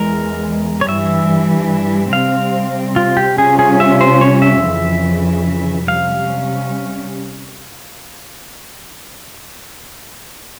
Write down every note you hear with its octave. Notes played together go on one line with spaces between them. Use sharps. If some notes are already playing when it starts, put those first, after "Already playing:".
Already playing: E2 E3 G#3 A#4
C#5
G2 E3 G3 E5
C3 G3 C4 F5
F4
G4
C3 G3 C#4 F4 G#4
G#4
E5
C5
C#5
E5
F2 C#3 E3
C3 G3 C#4 F5